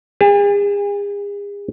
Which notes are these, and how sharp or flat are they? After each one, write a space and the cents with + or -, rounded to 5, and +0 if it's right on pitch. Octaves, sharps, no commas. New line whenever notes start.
G#4 -40 A5 +0